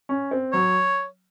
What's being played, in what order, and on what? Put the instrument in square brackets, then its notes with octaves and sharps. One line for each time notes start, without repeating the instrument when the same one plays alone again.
[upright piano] C#4
C4
[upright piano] F#3 [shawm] C#5